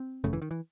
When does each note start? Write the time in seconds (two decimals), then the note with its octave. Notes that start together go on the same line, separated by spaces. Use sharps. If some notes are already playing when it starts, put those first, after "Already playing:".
Already playing: C4
0.24 G#1 F#2 C#3 A3
0.33 E3
0.42 D#3
0.51 E3